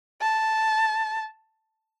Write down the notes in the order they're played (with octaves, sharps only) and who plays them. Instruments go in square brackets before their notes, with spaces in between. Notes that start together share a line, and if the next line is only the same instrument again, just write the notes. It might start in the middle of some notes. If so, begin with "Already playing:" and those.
[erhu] A5